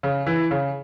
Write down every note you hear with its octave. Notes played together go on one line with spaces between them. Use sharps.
C#3
E3
C#3